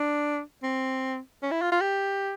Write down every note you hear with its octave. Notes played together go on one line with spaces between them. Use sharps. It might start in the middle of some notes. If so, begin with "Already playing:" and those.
Already playing: D4
C4
C#4
E4
F4
F4
G4